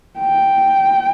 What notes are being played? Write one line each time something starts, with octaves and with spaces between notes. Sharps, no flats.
G5